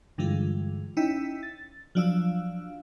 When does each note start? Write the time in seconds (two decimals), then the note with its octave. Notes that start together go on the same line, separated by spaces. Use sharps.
0.18 G2 D3 E3 G#3 F4
0.97 C#4 D#4 E4 G5 E6 B6
1.43 A6
1.95 F3 F#3 D4 F5 E6